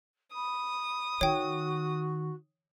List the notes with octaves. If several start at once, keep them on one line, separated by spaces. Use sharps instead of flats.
B5 D#6
D#3 F#4 C#5 G5